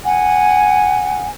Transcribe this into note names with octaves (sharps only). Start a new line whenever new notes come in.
F#5 G#5